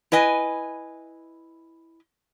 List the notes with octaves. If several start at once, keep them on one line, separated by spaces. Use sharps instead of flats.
E4 B4 D#5 G#5